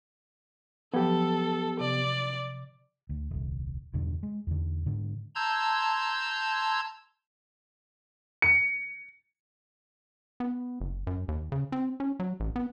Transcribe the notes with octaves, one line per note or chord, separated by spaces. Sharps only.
F3 F#3 B3 G4 A4
C3 D5
D2
D#1 C2
E2 G2 B2 D3
G#3
E2 D3
G#2 D3
A5 A#5 C6 E6 G6 G#6
C#7
B3
F#1
F#2
D#2
C#3
C4
C#4
F#3
A1
B3